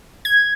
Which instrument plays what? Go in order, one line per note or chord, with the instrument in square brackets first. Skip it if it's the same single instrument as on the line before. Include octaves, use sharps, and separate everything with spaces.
[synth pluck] G#6